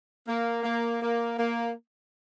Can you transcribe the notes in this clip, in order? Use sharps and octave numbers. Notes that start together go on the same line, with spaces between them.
A#3
A#3
A#3
A#3